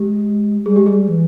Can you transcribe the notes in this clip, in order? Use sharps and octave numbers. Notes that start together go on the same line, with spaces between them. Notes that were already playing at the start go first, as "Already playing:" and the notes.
Already playing: G#3 G4
G3 G#4
G#3 G4
G3 G#4
E3